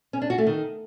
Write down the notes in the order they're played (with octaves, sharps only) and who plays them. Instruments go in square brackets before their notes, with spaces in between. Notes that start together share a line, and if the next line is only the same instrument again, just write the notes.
[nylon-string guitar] C#4
D4
F#4
A3
D#3